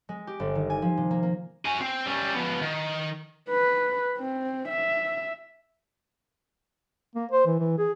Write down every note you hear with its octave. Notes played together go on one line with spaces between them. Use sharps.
G#3
G4
G1
D#3
G#5
F3
C3
A#3
A#3
F#4 G#5
C4
G3 C#4
F3 B3
D#3
B4
C4
E5
A#3
C5
E3
E3
G#4